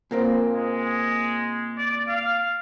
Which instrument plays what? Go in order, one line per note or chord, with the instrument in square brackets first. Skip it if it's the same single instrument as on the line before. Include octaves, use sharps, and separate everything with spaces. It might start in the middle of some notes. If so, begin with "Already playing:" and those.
[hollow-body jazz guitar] A#2 A#3 C4
[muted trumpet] G#3
D5
F5